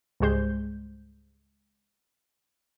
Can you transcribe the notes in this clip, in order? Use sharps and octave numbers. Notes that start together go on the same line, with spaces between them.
C#2 G#2 G3 G#3 C5 G6